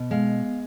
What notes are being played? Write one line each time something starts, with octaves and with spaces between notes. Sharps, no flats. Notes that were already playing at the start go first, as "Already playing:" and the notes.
Already playing: B2
G#3 F5